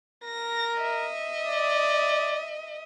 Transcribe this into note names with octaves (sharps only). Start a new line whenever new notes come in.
A#4 A#6
D#5 E5
D5